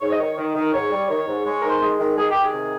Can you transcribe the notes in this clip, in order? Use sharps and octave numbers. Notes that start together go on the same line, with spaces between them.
G#2 C#5
D#5
D#3 C#5
D#3
D#3
G#2 C#5
G3
D#3 C#5
G#2
G#3 C#5
D#3 A#4
C5
G#3
D#3
D#3 G#4
D#3 G4
G#4
C3